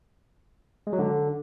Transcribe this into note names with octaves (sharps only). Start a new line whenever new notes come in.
G#3
F#3
D3